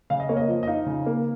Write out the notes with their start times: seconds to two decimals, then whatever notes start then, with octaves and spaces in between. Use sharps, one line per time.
0.10 C#3 F5
0.20 D#5
0.29 A#3 C#5
0.37 D#5
0.48 F3
0.63 D#5
0.67 D#4 F5
0.86 C#3
1.06 A#3